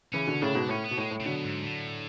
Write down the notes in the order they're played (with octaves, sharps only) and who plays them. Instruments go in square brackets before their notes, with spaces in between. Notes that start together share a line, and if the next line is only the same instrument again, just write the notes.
[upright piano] C#3 E3 [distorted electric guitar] C#4
[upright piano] B2 D3
[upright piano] A2 C#3 [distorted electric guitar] D4
[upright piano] G#2 B2
[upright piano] A2 [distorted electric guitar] C#4
[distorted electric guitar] B3
[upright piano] B2
[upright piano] A2 [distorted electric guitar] G#3
[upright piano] A2
[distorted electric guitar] C#3
[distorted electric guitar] B2 [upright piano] D3 F#3
[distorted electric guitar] G#2
A2